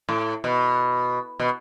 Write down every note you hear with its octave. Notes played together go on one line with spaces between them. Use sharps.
A2
B2
B2